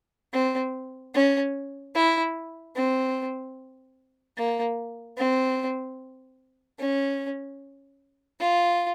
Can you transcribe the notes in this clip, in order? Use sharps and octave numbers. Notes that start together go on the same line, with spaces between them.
C4
C#4
E4
C4
A#3
C4
C#4
F4